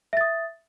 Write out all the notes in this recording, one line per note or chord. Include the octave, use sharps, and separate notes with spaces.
E5 D#6 A6